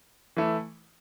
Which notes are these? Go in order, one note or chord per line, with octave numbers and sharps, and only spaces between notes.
E3 A3 E4